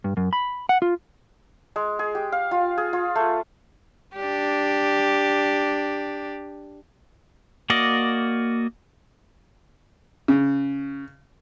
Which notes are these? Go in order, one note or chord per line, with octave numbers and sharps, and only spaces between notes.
G2
F#2
B5
F#5
F4
G#3
G#4
G4
F5
F4
G#4
F4
A3
D4 G4
A#3 F#4 D5 D#5
C#3